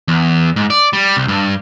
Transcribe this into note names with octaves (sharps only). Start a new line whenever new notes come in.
E2
G#2
D5
G3
C2
G2